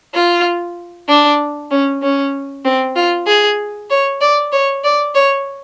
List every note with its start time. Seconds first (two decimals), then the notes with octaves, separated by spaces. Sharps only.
0.14 F4
1.09 D4
1.71 C#4
2.02 C#4
2.65 C4
2.96 F4
3.27 G#4
3.90 C#5
4.21 D5
4.52 C#5
4.84 D5
5.14 C#5